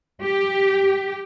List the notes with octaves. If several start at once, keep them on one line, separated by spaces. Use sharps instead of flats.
G4